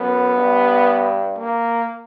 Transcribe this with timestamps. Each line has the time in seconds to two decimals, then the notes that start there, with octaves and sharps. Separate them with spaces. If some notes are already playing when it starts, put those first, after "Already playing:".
Already playing: F#2 B3
0.36 G2
1.38 A#3